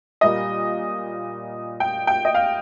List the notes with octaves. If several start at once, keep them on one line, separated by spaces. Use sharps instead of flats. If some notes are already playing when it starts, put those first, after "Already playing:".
A#2 G3 A#3 D#5
G5
G5
D#5
F5